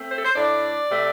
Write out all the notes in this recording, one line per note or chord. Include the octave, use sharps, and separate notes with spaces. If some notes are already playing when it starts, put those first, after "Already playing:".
Already playing: A3 C4
C5
A4
C5
A2 A3 D4 D5
C3 A3